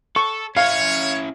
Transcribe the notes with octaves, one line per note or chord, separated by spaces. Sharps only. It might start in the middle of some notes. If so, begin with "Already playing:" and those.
A4 C#6
C#4 E4 C#5 F5